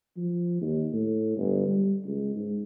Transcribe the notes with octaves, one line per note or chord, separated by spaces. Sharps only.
F3
D#2
A2
G1
G3
C#2
G#2